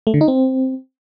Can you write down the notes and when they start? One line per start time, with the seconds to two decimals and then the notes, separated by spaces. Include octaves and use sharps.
0.07 A3
0.14 D3
0.21 D#4
0.28 C4